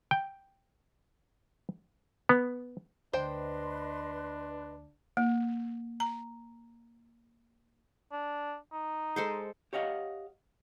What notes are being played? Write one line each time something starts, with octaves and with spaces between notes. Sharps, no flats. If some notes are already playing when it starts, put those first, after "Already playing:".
G5
B3
D2 D4 B4 C5 D#5 G5 C6
A#3
A#5
D4
D#4
G#3 A4 C5
G4 C#5 D#5 F5 F#5